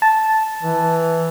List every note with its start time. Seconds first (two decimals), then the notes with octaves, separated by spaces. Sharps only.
0.02 A5
0.63 E3